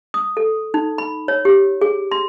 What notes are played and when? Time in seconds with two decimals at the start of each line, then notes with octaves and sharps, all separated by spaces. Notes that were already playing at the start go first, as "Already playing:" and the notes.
0.14 D#6
0.37 A4
0.74 D#4
0.98 B5
1.28 C#5
1.45 G4
1.82 G#4
2.11 C6